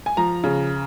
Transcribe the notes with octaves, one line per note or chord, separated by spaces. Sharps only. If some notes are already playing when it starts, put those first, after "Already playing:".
G#5
F3 A#5
C#3